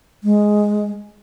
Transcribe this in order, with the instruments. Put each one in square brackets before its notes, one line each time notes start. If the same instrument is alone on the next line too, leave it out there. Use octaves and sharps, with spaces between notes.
[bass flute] G#3